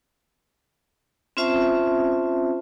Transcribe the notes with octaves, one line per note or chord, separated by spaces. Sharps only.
C4 C#4 F4 C5 E5 A5